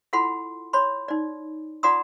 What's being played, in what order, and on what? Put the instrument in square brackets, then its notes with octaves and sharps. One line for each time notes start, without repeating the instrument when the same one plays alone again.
[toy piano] E4 F4 A4 F#5 B5 C6
C#5 B5 C6
D#4 D5
F4 D5 F#5 A#5 C6 D#6